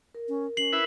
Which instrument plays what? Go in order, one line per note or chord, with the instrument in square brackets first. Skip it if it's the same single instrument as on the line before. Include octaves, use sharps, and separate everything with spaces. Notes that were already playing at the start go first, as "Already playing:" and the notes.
[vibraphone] A#4
[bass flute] C#4
[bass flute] C#4 [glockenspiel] C7 F#7
[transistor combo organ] E4 B4 E5